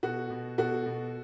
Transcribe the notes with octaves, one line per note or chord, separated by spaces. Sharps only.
B2 F#4 A4
B2
B2 F#4 A4
B2